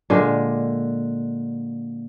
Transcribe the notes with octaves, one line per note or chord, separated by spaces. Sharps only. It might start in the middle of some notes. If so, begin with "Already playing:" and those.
A#2 D3 G#3